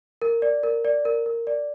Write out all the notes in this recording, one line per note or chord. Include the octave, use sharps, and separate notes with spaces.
A#4
D5
A#4
D5
A#4
A#4
D5